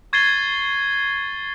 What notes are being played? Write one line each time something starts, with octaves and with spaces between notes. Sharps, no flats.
C#6 G#6 A6 C7 D#7 G7